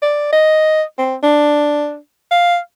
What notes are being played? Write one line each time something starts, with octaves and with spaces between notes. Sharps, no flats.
D5
D#5
C4
D4
F5